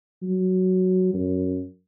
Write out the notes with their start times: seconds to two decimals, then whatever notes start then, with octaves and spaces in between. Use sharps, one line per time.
0.22 F#3
1.14 F#2